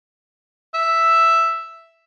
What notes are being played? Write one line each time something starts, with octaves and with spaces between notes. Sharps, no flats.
E5